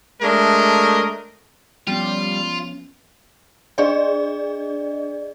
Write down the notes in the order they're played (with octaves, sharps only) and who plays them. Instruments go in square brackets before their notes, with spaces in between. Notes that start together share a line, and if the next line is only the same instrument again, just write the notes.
[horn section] G#3 A3 D4 A#4 D#5
[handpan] F3 B3 C#4 [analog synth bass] G3 [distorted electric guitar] F4
[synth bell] D4 G#4 D5 D#5